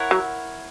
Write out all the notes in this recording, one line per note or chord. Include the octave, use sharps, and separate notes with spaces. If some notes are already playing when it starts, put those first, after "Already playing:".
Already playing: E4 A#4 C#5 F#5
F#3